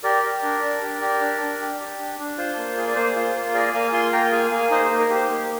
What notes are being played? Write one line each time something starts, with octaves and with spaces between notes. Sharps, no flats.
G4 A#4 D5
G4
D4
D4
G4
G4
D4
D4
G4
G4
D4
D4
F4 C5
A#3
G#4
D5
A#3 C5
F4
A#3
G#4 A#4 D5
A#3 F5 G#5
F4 G#5 C6
A#3 G5 A#5
G#4 F5 G#5
A#3 F5 G#5
D#4 C5 D#5
C5
A#3
A#4
G4
C5
A#3